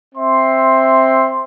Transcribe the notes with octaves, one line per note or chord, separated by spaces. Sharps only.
C4 E5 C6